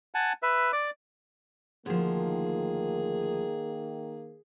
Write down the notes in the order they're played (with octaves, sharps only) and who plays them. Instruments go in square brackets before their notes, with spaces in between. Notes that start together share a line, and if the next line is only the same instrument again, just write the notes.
[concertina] F#5 G#5 A5
B4 E5
D5 D6
[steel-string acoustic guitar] D2 F3 [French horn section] D#3 A#3 [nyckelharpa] G#4